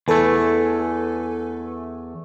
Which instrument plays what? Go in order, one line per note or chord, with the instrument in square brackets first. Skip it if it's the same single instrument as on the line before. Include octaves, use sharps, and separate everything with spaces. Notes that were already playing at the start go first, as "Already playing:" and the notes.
[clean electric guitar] E2 A3 [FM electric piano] A4 B4 G#5